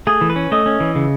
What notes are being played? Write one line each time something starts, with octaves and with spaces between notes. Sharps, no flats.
A3 G#4
E3
B4
C#4
A3 D#5
C#4
E3
C#3